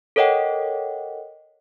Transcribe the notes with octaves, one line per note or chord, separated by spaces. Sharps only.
A4 A#4 C#5 D#5 F#5 G5